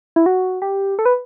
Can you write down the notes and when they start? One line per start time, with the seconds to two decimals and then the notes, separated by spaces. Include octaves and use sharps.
0.16 E4
0.26 F#4
0.62 G4
0.99 A4
1.05 B4